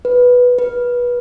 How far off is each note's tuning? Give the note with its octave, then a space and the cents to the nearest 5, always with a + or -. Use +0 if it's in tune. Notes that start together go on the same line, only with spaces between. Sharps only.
B4 -5
B4 -20